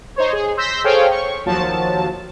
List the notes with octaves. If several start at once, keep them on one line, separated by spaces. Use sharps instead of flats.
D#4 C5 C#5
G#4
C6 E6 G6 A#6 B6
G#4 A4 C5 C#5 F5 G5
C#6
D#2 F3 F#3 A5